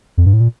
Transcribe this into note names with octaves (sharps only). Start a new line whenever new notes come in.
F2
G2
A2
A#2